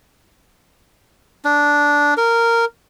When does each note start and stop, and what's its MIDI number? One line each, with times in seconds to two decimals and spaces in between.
1.45 2.14 62
2.17 2.65 70